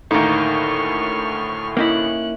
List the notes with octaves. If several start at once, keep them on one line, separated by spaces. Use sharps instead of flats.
D2 A2 D#3 A#3 D#4 C#6 F6
A#3 C#4 D#4 E4 F#6